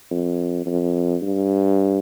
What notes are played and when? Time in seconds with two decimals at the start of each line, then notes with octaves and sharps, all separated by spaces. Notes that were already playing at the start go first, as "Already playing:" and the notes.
0.11 F2
0.66 F2
1.22 G2